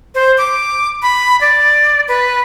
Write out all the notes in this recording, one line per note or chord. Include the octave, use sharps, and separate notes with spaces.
C5
D6
B5
D5
B4